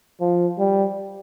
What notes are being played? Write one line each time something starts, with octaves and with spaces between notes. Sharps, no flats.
F3
G3